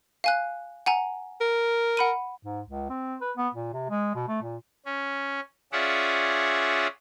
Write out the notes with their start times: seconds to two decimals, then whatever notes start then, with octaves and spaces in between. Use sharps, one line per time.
0.24 F5 G#5 F#6
0.86 F#5 G#5 A#5
1.40 A#4
1.97 F#5 B5 D#7
2.43 G#2
2.68 C#2
2.90 C4
3.21 B4
3.37 B3
3.55 A#2
3.73 C3
3.90 G#3
4.15 B2
4.28 A3
4.42 A#2
4.86 C#4
5.72 C#4 F4 G#4 D5 E5 F#5